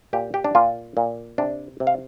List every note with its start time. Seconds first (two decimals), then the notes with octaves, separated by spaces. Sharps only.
0.13 A#2 G4
0.34 G4
0.44 D4
0.55 A#2 F4
0.97 A#2
1.38 C3 D4
1.80 C3
1.87 F5